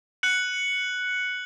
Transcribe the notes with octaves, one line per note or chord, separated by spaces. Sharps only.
F#6 C#7 F#7